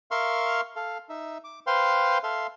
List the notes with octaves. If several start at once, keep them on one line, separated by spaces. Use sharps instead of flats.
A#4 E5 F5 C6 C#6 F6
A4 F5
D#4 E5
D6
B4 C5 F5 G5 C6
A4 E5 F5 C6